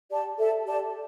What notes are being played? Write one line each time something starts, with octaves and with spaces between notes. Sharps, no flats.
G4 D5 A5
A4 E5 A5
G4 D5 A5